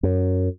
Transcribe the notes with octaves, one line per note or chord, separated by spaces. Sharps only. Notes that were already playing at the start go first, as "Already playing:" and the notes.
F#2